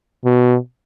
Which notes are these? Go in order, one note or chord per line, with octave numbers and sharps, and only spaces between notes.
B2